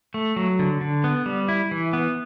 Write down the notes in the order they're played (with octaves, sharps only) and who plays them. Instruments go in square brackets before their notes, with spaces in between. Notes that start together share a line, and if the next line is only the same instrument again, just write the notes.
[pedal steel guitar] A3
F#3
D3
D3
B3
G3
E4
E3
B3